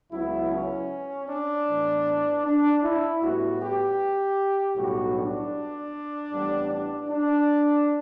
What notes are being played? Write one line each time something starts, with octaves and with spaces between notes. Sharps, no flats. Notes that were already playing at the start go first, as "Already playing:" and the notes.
C#2 C#3 F#3 B3 E4
C#4
D4
A2 E3 B3
D4
E4
A2 G3 B3 F#4
G4
B1 A2 G3 B3 F#4
D4
A1 A2 G3 B3
D4
D4